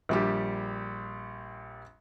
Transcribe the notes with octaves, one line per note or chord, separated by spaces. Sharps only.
A#1 G3 G4